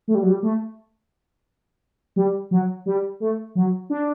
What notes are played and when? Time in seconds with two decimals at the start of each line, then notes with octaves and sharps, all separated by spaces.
0.08 A3
0.15 G3
0.23 F#3
0.30 G3
0.43 A3
2.16 G3
2.51 F#3
2.86 G3
3.20 A3
3.55 F#3
3.90 D4